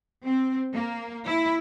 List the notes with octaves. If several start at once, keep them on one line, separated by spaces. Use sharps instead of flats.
C4
A#3
E4